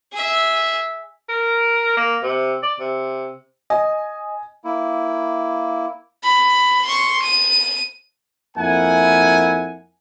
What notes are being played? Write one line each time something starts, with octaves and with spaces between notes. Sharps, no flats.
G#4 E5
A#4
A#3
C3
D5
C3
D#5 G#5
A#3 E4
B5
C6 C#6
D#7
F2 A#3 E4 F#5 G#5